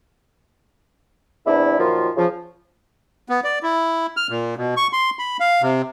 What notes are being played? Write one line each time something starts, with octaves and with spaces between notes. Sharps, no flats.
E2 C3 D4 E4
F#2 A#2 D#3 F3 F4
C#3 F3
B3
D5
E4
F6
A#2
B2
C#6
C6
B5
F5
C3